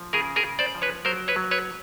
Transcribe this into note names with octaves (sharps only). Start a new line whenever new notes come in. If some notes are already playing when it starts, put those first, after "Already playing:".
Already playing: F3
C#3 G#4 A#4
G#4 A#4
C#3
C5 D5
F3
B4 C#5
F#3 A#4 C5
B4 C#5
F#3
B4 C#5